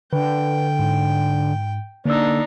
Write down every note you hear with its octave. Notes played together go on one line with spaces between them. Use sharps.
D3 B4 G5
G#2
D3 A#3 D4 D#4 E6